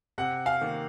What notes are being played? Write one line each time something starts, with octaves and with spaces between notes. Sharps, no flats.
C3 F#5
F5
D#3 A#3